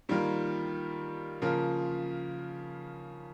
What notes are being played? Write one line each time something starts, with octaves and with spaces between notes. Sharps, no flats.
D#3 G3 A#3 F4 A#4
C#3 F3 A#3 F4 A#4